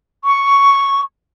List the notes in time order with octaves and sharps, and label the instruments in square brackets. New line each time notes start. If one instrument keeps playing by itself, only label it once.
[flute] C#6